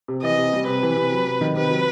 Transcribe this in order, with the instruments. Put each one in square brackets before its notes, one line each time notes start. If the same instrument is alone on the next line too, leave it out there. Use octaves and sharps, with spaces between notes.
[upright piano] C3
[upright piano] E3 [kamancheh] D#5
[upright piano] C3
G3
[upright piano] C3 [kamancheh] B4
[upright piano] E3
C3
F#3
C3
D#3
[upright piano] C3 [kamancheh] B4
[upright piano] F#3